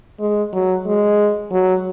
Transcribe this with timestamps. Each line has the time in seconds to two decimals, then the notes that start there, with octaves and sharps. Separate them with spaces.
0.20 G#3
0.53 F#3
0.86 G#3
1.52 F#3